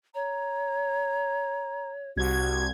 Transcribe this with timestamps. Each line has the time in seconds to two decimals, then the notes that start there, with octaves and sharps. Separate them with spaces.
0.15 C#5 A#5
2.16 C2 F#4 G#6